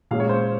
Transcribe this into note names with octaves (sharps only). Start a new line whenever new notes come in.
A#2 G#3 C#4 F5
C#5
C5